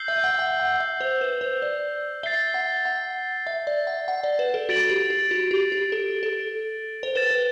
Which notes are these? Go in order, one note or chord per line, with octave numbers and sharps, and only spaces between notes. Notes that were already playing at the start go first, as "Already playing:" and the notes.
Already playing: E6 G6 C7 G7
E5
F#5
F#5
F#5
E5
C5
B4
C5
D5
E5 A6 C7 G7
F#5
F#5
E5
D5
F#5
F#5
D5
B4
A4
F#4 A6 D7 F#7
G4
G4
F#4
G4
G4
A4
A4
C5
B4 A6 E7 G7
B4